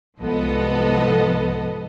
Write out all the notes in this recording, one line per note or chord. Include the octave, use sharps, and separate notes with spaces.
C2 G#2 F3 B3 A4 D#5